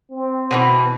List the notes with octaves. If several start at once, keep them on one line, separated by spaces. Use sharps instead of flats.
C4
B2 D3 E3